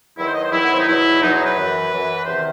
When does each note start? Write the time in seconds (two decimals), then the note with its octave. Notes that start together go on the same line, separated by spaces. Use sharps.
0.16 E2 D#3 F#3 E4
0.25 C5
0.34 D#5
0.42 C5
0.51 E2 D#3 F#3 E4
0.63 B3
0.71 C4
0.78 D#4
0.86 E2 B2 F#3 E4
1.21 E2 B2 F#3 D#4
1.33 D#4
1.44 B4
1.56 F#2 E3
1.91 F#2 E3
2.25 E2 C3 D#3 C5